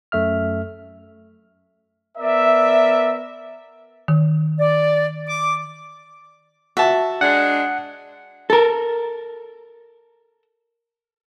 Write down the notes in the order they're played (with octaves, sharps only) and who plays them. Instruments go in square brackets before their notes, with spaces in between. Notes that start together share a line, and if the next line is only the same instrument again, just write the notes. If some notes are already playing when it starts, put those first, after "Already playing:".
[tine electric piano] F#2 A3 E5 F6
[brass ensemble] B3 A#4 D5 E5
[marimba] D#3
[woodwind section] D5
D6
[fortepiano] F#4 A5 [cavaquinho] E5
[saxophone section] G#3 D4 [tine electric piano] F#5
[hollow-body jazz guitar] A4 A#4